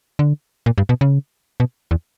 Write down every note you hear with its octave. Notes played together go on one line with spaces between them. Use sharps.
D3
A#2
G2
B2
C#3
B2
E2